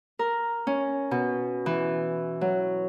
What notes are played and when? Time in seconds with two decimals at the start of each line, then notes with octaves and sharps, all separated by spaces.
0.19 A#4
0.67 C#4
1.11 B2
1.66 E3
2.41 F#3